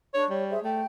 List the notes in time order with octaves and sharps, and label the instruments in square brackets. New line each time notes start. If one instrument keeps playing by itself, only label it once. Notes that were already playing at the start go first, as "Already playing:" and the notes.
[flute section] D4 G#4 C#6 [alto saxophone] C#5
[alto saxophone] G3 [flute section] C#5
[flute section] G#4 C5 E5
[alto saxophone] A3 [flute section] G5